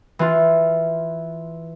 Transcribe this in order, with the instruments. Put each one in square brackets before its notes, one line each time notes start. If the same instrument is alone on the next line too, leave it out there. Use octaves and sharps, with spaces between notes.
[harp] E3 F4